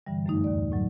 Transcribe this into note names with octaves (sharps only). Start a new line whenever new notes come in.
G2 D3 E3 G3
F#2 A3 D#4
D#2 A2 D5
A2 F#3